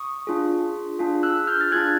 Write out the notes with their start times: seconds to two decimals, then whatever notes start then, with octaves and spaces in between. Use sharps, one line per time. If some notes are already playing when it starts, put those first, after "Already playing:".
Already playing: C#6 D#6
0.27 D4 F4 G#4
0.99 D4 F4 G#4
1.23 E6 F#6
1.47 F6 G6
1.61 A6
1.71 D4 F4 G#4 F#6 G#6